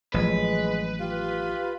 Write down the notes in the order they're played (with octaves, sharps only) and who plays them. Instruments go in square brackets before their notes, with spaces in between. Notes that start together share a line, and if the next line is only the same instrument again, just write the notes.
[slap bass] A1 F3 F#3 [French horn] G#3 [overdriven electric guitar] B4
[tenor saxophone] F4 [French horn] G4